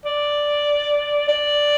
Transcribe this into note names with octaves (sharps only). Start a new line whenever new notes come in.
D5
D5